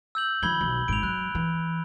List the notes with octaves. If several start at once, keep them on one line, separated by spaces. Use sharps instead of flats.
E6 G6 F#7
D#3 F3 B5 G#6 G7
B1
G#1 G#2 D7 F7
F#3 F#6
E3